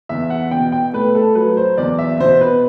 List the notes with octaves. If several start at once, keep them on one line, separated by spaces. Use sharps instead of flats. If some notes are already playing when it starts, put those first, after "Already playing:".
E2 E5
F#5
B2 G5
G5
A3 B4
A4
F#3 B4
C5
E2 D5
E5
B2 C5
B4